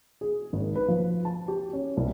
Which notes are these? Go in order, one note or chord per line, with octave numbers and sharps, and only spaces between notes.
G#4
G#1
B4
F3
A5
G4
C#4
C2